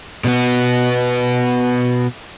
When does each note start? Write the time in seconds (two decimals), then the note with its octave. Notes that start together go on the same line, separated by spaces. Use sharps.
0.24 B2 B3